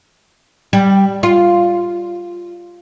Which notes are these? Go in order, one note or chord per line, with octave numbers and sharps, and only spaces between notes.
G3
F4